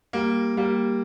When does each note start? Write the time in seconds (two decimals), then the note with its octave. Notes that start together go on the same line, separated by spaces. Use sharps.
0.13 G3 A#3
0.57 G3 A#3